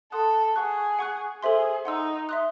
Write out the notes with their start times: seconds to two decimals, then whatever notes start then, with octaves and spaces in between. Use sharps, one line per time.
0.12 A4 F#5 A5 C6 D#6 F#6
0.56 G#4 F#5 C#6 F#6
0.99 F#5 C#6 F#6
1.42 G#4 A4 C5 E5 C6
1.85 D#4 F#5 C6 E6
2.29 E5 C6 D#6 F#6